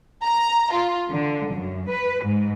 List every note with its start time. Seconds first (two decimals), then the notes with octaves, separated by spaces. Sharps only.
0.25 A#5
0.72 F4
1.11 D3
1.52 F#2
1.89 B4
2.23 G#2